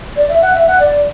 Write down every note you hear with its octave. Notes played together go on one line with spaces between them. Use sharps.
D5
E5
F#5
E5
F#5
D5